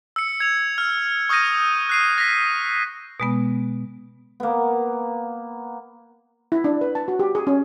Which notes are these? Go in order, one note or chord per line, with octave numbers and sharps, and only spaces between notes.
E6 C#7
G#6 F7
F6
C#6 D#6 F6 G6 A#6 D#7
F#6 C7 D#7
A#6 B6
B2 G#3 B3
A#3 B3
E4
D4
B4
A5
F#4
G4
G#4
C#4